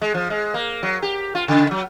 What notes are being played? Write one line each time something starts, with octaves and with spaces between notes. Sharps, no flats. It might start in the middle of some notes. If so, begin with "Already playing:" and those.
G#3
F3
G#3
A#3
F#3
G4
F4
C#3
F#3